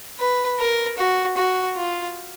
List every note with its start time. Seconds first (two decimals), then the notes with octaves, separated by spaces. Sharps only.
0.19 B4
0.59 A#4
0.98 F#4
1.37 F#4
1.76 F4